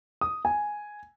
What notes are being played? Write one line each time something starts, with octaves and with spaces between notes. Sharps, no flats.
D#6
G#5